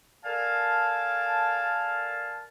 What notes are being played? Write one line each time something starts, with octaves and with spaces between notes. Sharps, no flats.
A4 A#4 D5 F5 G#5 A5